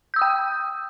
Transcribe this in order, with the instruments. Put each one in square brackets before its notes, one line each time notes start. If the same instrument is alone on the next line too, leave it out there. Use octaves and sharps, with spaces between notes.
[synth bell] G6
E6
D#6
G5